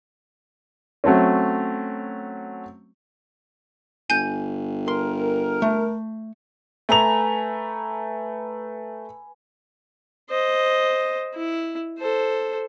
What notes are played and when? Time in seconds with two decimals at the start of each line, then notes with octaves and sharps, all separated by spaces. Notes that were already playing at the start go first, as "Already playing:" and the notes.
1.04 F#3 A3 C4 C#4
4.10 G1 G#5 G6
4.88 A#4 C6
5.62 A3
6.89 A3 B4 G#5 A#5 F7
10.30 C5 D#5
11.34 E4
11.99 A4 C5